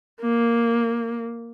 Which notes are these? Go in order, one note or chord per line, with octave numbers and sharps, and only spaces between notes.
A#3